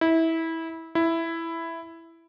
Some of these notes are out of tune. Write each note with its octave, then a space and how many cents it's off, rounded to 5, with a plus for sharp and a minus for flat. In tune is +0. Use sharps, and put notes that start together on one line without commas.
E4 -20
E4 +5